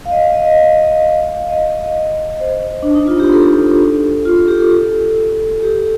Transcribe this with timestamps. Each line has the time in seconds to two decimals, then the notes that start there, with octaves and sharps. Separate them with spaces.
0.06 F5
0.11 D#5
0.22 F5
0.33 D#5
0.45 D#5
0.56 F5
1.49 D#5
2.40 C5
2.83 D4
2.95 D#4
3.07 F4
3.20 G4
3.32 A4
4.25 F4
4.36 A4
4.48 G4
4.59 A4
5.60 A4
5.63 G4